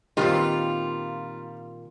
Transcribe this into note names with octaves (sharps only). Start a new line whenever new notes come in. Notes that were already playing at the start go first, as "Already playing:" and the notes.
A#2 D#3 G3 B3 C4 F4